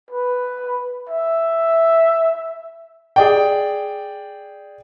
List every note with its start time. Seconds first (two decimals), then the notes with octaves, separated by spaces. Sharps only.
0.11 B4
1.09 E5
3.16 G#4 D5 G5